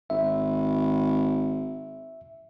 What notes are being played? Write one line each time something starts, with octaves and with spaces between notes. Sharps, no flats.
G#1 E5